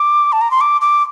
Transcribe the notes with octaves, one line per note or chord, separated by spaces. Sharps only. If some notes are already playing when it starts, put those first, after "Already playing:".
Already playing: D6
A5
A#5
C6
D6
D6